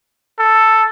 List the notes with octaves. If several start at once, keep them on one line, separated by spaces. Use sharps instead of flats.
A4